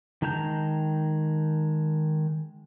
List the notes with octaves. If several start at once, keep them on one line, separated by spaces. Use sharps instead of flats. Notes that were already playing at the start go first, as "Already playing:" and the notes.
D#3 G#3 A5 A#5 G6